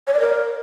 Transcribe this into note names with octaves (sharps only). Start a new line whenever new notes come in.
C#5
D5
A#4